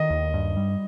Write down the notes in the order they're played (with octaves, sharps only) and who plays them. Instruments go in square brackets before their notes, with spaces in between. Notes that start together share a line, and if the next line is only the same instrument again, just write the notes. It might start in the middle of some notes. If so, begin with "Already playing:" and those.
Already playing: [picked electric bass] D#3 [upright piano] D#5
[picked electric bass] D#2
G2
G3